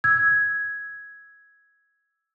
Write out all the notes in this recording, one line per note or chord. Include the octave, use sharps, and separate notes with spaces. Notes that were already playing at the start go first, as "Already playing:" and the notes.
E6 G#6